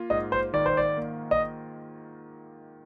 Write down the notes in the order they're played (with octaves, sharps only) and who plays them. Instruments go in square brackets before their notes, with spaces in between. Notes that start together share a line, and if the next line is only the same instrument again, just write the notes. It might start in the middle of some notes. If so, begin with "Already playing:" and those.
Already playing: [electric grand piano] A#3 F4
[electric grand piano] G#2 [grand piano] D#5
[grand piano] C5
[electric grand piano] D#3 [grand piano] D5
[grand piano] C5
D5
[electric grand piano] A#3
[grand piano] D#5